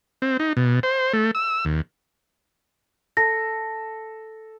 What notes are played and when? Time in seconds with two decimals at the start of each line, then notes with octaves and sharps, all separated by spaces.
0.22 C4
0.39 D#4
0.57 B2
0.83 C5
1.13 A3
1.35 E6
1.65 D#2
3.17 A4 A#6